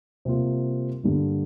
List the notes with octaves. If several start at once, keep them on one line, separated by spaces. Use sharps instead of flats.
C3 G3 A#3 F4
G2 D3 G3 A#3